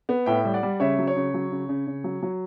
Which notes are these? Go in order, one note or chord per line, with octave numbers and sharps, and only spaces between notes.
B3
A2 E5 G5
G3
D5 F#5
G3
C#3 C#5 E5
F#3
C#5
C#3
F#3
C#3
C#3
C#3
F#3
F#3